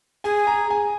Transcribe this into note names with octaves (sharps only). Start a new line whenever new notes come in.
G#4 G#5
A#5
G#5